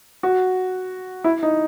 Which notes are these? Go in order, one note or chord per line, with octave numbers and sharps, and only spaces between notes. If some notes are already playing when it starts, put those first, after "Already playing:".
F#4
E4
D#4